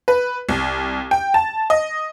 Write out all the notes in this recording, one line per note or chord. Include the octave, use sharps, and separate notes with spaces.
B4
C2
G5
A5
D#5